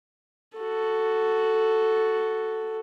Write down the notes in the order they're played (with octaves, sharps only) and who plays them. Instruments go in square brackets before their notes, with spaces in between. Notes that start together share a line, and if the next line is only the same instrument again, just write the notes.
[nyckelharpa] F#4 A4